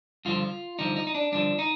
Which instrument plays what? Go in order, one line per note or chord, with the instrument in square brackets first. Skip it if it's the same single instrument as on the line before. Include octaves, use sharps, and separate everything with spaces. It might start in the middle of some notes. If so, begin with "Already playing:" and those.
[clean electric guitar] G2 D3 F3 F4
G2 D3 F3 D#4
D#4
D#4
D4
G2 D3 F3 D4
D#4